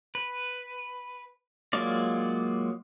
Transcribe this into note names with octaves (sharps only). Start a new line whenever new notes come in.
B4
F#3 G#3 A#3 F4 D5